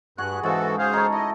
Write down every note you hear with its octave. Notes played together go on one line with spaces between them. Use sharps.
G2 F#4 G#4 F#6
G#2 C#3 E3 F#4 A4
G#4 C5 F5
D#4 A4 C#5
E4 D#5